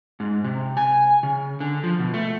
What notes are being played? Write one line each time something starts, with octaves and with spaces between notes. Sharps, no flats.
G#2
C3
G#5
C#3
D3
F3
B2
A3